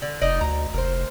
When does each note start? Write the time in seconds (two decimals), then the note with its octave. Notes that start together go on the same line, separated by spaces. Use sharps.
0.02 D3
0.22 F1 D#4 D5 D#5
0.41 D2 A#5
0.74 F1 A#4 C5